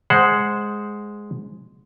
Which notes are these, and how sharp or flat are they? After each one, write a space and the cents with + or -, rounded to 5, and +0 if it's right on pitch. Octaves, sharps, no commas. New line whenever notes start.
G#3 +0 C5 +0 F#5 +0